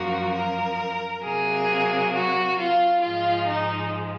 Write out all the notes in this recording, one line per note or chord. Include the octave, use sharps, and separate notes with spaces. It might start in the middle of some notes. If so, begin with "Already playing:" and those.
Already playing: F#2 F3 A#3 F#4
A#4
C3 F#3 A#3 G#4
F#4
F4
G#2 F3 G#3 F4
D#4